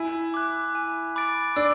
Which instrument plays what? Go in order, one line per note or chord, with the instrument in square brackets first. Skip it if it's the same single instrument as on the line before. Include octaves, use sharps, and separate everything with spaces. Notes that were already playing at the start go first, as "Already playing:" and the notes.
Already playing: [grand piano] E4 [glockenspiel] G#5
[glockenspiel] D6 F#6
G#5
B5 D6 A6 D7
[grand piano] D4 [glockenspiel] E6